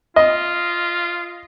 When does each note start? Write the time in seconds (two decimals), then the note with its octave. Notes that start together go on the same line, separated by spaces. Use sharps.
0.16 F4 D#5